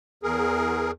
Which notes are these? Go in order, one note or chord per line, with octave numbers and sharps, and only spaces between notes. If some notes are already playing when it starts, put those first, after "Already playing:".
E2 G#4 A#4